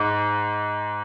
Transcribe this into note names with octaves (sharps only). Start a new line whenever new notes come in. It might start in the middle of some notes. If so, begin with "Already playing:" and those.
Already playing: G#2